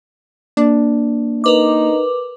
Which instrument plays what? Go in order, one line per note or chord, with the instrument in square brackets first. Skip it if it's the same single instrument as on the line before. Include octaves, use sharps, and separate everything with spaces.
[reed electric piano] A#3 [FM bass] D4
[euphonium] D#4 [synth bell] A#4 B4 D6